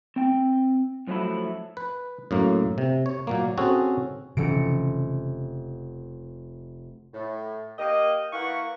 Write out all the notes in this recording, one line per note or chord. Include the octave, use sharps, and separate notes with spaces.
C4 G5
F#2 F3 F#3 A3 E4
B4
F#2 A2 A#3
C3
C#5
A#2 F#3 A#3
C4 C#4 F#4 G#4 A4
F1 C#3 E3 C#4 C#7 D7
A2
A#3 G4 D#5
E3 A#3 F#5 C#6